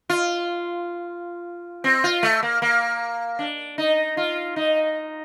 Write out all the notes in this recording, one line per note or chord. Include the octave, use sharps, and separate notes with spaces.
F4
C4
F4
A3
A#3
A#3
D4
D#4
F4
D#4